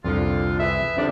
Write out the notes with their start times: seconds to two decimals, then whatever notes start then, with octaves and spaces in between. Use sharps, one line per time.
0.04 C2 F2 D3 F4
0.58 G#4 B4 E5
0.97 D3 F3 G3 C4 D4